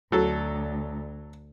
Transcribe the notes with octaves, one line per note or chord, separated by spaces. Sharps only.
D2 F#3 A4